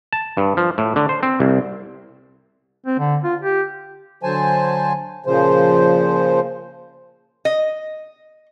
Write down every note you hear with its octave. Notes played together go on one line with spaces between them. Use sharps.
A5
G2
F3
A2
D3
C5
C4
C2
C4
D3
F4
G4
D3 F#3 C5 G#5 A5
A#2 C#3 F3 C5
D#5